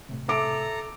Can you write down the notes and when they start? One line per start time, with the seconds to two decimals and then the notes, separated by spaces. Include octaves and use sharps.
0.09 A2 C3
0.28 A4 E5 A#5 D6 D7